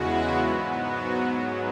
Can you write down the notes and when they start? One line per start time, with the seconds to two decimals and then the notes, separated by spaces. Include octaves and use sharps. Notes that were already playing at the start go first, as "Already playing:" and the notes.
Already playing: E2 C#3 G#3 B3 E4 F#4
0.35 G#2 F#3 B3
0.77 F#4
1.19 G#2 F#3 B3